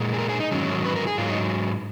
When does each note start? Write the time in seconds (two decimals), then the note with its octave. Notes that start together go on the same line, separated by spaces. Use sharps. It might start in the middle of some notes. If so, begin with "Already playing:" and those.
Already playing: A#2 G#3
0.14 G#4
0.18 A#4
0.29 G#4
0.40 D#4
0.52 G#2 D#3 F#3 C#4
0.85 B4
0.95 A#4
1.07 G#4
1.18 G#2 F#3 F4
1.30 D#4